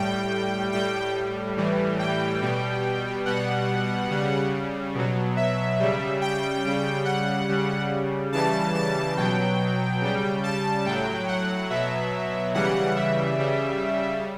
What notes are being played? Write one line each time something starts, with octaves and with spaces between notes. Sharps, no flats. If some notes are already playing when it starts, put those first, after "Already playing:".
Already playing: A2 G3 G5
A2 G3 G5
A2 E3 G3
G5
B2 G3
B2 G3 F#5
C#3 G3
B2 F#3
E5
C#3 G3
G5
C#3 G3
F#5
C#3 G3
C#3 E3 G3 A5
A5
B2 F#3 G5
C#3 G3
A5
A2 F#3 G5
F#5
B2 F#3 E5
C#3 E3 G3 F#5
E5
C#3 G3